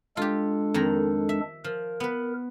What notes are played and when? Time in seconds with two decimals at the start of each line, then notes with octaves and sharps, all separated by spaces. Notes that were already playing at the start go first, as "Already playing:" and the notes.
0.17 G#3 D4 F4 G4 A4
0.74 F2 D#3 A#5
1.29 E5
1.64 F3 A#4
2.00 B3 B4